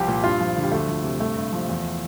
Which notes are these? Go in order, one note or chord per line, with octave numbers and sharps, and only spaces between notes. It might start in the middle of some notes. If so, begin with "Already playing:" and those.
Already playing: C2 F3 G4
A#2
G2 F4
F3
D3
G3
D2 A3
F3
C3
G2 A3
G2
F3
E2